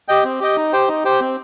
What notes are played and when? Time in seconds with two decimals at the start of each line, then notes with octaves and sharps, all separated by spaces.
0.08 G4 D#5 G5
0.24 C4
0.40 G4 D#5 G5
0.56 D#4
0.73 G4 C5 G5
0.88 D#4
1.04 G4 C5 G5
1.20 C4